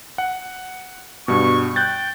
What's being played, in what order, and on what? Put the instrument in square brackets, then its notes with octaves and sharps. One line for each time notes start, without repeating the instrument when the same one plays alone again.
[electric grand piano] F#5
[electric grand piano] G2 B2 [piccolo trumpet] C#6
[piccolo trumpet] G5 [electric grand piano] F#6 G6 A6